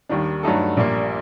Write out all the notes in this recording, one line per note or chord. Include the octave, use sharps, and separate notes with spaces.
D#2 D#3 G3 D4
G2 F#3 A3 D#4 A4
A#1 A#2 G3 A#3